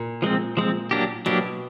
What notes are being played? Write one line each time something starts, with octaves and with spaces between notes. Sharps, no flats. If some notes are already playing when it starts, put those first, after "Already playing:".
Already playing: A#2
F3 G#3 C4
F3 G#3 C4
F#3 A#3 D4 G4
B2 F#3 A#3 D4 G4